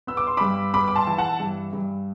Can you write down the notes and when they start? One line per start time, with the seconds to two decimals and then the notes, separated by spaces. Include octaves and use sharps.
0.07 B3 E6
0.17 D6
0.27 C6
0.37 G2 B5 D6
0.73 B3 B5 D6
0.88 D6
0.96 A5 C6
1.07 E3
1.18 F#5 A5
1.40 G2
1.73 G2